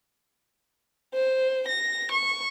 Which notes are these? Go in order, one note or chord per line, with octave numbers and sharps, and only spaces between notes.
C5
A#6
C#6